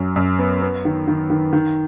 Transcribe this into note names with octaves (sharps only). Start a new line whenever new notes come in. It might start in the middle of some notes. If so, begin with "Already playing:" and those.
Already playing: F#2 F#3
F#2
B3
B3
D#3
D#3
D#3
D#3